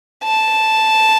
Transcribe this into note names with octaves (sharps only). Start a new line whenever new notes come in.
A5